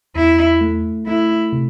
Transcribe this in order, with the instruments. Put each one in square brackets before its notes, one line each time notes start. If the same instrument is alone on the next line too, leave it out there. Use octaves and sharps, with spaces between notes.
[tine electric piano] E2 [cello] E4
[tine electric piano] A3
[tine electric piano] A3 [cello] E4
[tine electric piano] C3